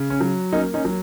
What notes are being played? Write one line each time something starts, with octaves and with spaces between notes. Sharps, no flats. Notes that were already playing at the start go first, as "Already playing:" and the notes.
Already playing: C#3
C#4
F#3
A#3 C#4 D#4
C#4 D#4
F#3